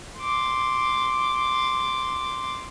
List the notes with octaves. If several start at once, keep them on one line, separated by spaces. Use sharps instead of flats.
C6 D6